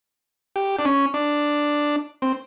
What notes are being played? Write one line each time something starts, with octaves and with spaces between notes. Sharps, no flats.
G4
D4
C#4
D4
C4